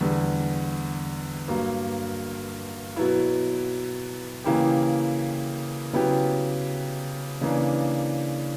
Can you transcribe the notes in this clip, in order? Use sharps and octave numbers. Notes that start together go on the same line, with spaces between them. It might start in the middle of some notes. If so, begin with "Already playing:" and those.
E2 D3 G3
G2 F#3 A#3
B2 F#3 B3 E4
C#3 E3 A#3 E4 G4
C#3 F#3 B3 E4 G4
C#3 E3 A#3 D4